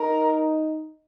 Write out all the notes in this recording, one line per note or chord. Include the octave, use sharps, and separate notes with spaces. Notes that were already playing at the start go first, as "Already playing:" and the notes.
Already playing: D#4 A#4